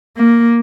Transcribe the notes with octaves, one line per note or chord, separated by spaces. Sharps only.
A#3